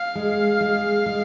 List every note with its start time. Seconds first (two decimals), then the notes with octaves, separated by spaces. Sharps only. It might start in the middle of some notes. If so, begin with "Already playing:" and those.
Already playing: F5
0.15 G#3
0.60 G#3
1.06 G#3